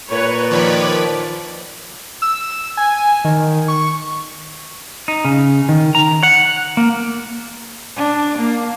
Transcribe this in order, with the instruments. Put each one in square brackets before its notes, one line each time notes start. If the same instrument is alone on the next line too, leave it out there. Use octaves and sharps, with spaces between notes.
[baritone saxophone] A#2 [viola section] B4 C#5
[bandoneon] D#3 F3 [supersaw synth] B4 C#5 B5 [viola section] D5
[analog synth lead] E6
G#5
D#3
C#6
[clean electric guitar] D#4
C#3
D#3
A#5
F#5
A#3
[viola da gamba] D4
A#3